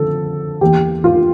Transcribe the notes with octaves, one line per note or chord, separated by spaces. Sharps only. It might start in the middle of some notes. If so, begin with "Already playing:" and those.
Already playing: D3 F3 C4 A4
E2 E3 A#3 G4
F4